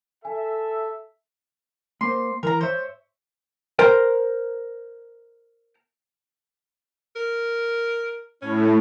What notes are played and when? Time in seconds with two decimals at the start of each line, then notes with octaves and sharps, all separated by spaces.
0.25 A4 E5 G#5
2.01 A#3 C5 C6
2.43 E3 A#4 A#5
2.61 C5 C#5 E5
3.79 A#4 C5 G5
7.16 A#4
8.42 A2 C#4